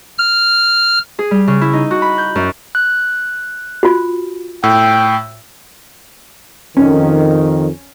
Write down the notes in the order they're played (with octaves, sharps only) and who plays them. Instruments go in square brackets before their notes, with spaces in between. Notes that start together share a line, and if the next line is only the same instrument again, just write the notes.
[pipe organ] F6
[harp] G#4
G3
C#3
E4
D#4
F#4
B5
G6
F#2
[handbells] F#6
[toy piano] F4 F#4
[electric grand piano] A2 [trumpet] G5 [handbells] E6
[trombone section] F2 D#3 [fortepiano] C#4